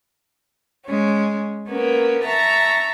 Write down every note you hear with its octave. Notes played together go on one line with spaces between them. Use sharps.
G#3 C#4
A#3 B3 C#4
E5 A5 A#5 C#6